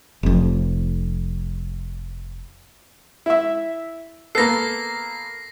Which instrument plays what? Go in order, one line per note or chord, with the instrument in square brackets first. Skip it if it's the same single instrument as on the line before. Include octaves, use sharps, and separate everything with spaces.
[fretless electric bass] F1 F2
[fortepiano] E4 E5
[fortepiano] A#3 B3 A4 [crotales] A#6 C7